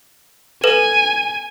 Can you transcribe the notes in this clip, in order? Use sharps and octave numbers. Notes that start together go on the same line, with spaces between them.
A4 B4 G#5 E7